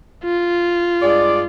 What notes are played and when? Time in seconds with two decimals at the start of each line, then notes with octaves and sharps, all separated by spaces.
0.24 F4
1.02 G2 G#3 D5